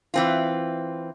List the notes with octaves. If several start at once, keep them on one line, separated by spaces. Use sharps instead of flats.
E3 C4 F4